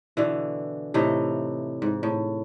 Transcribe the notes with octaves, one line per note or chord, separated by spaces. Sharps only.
B2 D3 E3
A2 C3 E3 D#4
G#2
A2